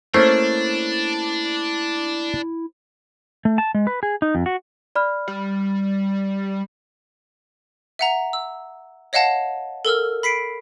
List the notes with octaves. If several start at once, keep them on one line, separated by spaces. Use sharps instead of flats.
A3 A#3 C#4 D4 E4 C5
A3
A5
G#3
B4
G#4
D#4
F2
F#4
D5 B5 F6
G3
E5 F#5 A#5
E6
C#5 D#5 F5 F#5 A5
A4 A#4 E6 F6
B5 B6 C7 D7